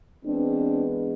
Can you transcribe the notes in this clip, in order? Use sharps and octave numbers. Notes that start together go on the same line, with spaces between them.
E3 G#3 B3 C4 D4